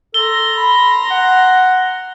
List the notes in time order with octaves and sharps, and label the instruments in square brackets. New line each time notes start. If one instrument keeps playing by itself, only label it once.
[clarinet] A4 [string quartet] A#5 C6 A#6 [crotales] G7
[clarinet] B5
F#5